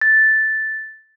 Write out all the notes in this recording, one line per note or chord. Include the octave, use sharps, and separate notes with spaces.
A6